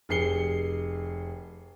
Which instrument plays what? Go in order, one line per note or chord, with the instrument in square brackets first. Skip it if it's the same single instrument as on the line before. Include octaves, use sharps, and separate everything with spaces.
[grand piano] F1 G#4 C7 C#7 G7